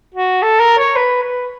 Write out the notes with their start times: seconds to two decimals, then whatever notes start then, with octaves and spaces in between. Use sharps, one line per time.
0.14 F#4
0.42 A4
0.60 A#4
0.78 C#5
0.96 B4
1.23 B4